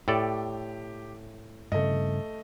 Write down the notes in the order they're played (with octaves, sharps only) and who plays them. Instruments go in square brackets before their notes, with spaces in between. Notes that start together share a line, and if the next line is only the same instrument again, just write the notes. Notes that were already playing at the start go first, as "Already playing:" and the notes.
[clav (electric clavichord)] A2 A4 D5 [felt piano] G4
[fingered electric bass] G2 C#3 [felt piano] A3 D#5